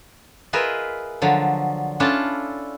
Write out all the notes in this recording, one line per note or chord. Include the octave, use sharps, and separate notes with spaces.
F4 G#4 A#4 B4 D#5 E5
D3 F3 F#3
C#4 D4 E4 F4 A4 A5